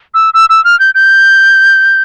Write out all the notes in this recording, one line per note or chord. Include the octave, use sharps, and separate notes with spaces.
E6
E6
E6
F6
G6
G6